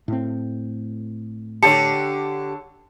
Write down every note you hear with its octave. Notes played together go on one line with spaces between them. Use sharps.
A2 C4
D3 G4 C#5 A5 C#7